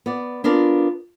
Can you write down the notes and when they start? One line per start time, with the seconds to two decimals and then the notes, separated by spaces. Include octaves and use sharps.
0.06 B3 D5
0.44 B3 D4 F4 A#4 D5